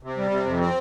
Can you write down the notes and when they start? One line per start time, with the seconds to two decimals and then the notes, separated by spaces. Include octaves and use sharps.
0.03 C3
0.17 G3
0.31 C3
0.46 F2
0.60 C4